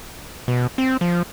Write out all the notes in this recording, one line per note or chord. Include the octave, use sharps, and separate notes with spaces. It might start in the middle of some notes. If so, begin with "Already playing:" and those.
B2
C4
F3